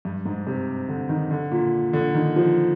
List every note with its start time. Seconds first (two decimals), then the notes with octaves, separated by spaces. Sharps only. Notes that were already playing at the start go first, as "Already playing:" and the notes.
0.05 G2
0.26 G#2
0.47 C3
0.89 D3
1.09 D#3
1.31 D3
1.51 A#2
1.93 D3
2.15 D#3
2.36 F3